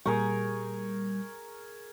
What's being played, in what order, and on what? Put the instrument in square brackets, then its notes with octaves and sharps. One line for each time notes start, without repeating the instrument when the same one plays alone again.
[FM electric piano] A#2 G3 [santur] G#4 A#4 C#6